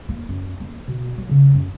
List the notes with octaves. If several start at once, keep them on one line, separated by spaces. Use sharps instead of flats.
A#3
F#2
A#3
B2
F#3
C#3
F#2